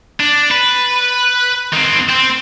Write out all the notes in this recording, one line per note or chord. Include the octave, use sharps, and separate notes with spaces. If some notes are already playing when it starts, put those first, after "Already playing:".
D4
B4
D#3 C4
C4